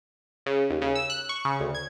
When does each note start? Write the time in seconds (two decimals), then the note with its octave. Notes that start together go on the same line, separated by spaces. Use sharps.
0.46 C#3
0.70 D#2
0.82 C#3
0.95 E6
1.10 F#6
1.29 C#6
1.45 C#3
1.60 D2
1.75 G#6